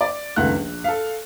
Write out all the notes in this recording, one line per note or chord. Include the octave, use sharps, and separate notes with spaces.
D5
C#2 D#3 A3 F#5 F#6
A#1
A4 F5